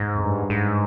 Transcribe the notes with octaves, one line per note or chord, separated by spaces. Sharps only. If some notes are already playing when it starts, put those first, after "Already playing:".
Already playing: G#2
F2
G2
G#2